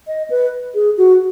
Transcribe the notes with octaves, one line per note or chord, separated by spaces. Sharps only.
D#5
B4
G#4
F#4